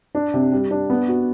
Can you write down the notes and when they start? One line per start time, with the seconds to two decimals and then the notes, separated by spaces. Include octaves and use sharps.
0.15 D4
0.34 C3
0.52 G3
0.71 D4
0.90 B3
1.08 F#4